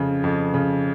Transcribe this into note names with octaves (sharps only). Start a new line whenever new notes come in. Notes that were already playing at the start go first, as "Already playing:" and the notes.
Already playing: F2 C#3
F2
C#3